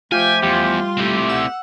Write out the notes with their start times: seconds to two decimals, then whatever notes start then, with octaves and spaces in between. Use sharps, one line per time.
0.12 F3 A3 F4 G4 G5 G#5
0.43 E2 G3 F4 C6
0.98 A3 C4 E4 G4
1.29 F#5 E6